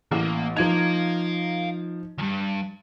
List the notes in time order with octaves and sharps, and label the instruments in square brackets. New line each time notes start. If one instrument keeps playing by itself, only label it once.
[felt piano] A1 [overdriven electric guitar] A#3
[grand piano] F3 D#4 [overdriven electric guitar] F5 A#5 [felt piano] G#6
[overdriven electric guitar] E2 G2